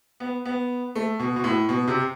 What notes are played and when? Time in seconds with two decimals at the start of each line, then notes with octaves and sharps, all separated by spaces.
0.20 B3
0.45 B3
0.95 A3
1.19 B2
1.36 B2
1.44 A2
1.69 B2
1.87 C3